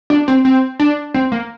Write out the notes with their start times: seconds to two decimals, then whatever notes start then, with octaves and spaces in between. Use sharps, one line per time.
0.10 D4
0.28 C4
0.45 C4
0.80 D4
1.14 C4
1.32 A#3